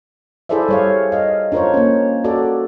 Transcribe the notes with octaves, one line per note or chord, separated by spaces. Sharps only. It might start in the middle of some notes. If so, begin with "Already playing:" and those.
E4 G#4 A4 C5 D5 E5
G3 C#5 F5
D#5 F5
D4 F4 A#4 C5 C#5
A#3 C#4
F#4 A4 D5